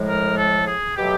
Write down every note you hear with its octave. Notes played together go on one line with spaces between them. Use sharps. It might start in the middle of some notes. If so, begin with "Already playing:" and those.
Already playing: A2 F3 G#3
A#4
A4
G#4
B2 F#3 A3 G4